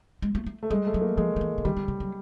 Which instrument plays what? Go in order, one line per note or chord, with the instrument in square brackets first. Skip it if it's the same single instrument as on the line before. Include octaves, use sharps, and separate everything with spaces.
[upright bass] G#3
A3
A3
[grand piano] A3
[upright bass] G3 [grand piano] G#3
[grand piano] A3
[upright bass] F#3
[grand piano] A#3
[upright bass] F3 [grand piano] G#3
[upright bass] F3
E3
D3
[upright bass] D#3 [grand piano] G3
[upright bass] D3
C#3
F#3